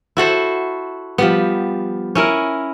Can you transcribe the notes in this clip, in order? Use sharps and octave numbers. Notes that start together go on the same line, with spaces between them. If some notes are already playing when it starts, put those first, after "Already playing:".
E4 F#4 A4 C5
F3 G3 B3
C#4 E4 A#4